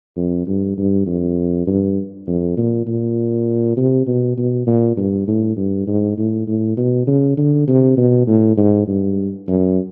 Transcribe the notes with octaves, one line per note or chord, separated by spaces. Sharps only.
F2
G2
G2
F2
G2
F2
A#2
A#2
C3
B2
B2
A#2
G2
A2
G2
G#2
A2
A2
B2
C#3
D3
C3
B2
A2
G#2
G2
F#2